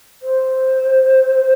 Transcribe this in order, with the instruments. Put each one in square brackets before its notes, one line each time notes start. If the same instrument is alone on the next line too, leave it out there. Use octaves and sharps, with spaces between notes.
[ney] C5